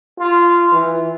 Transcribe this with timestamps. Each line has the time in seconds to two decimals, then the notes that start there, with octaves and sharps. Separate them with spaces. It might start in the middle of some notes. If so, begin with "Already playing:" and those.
0.19 F4
0.72 E3